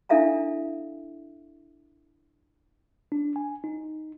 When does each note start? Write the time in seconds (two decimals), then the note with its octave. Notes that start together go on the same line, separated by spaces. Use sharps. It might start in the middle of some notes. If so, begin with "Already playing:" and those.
0.09 D4 E4 A4 E5 F5 A#5
3.12 D4
3.36 G#5
3.64 D#4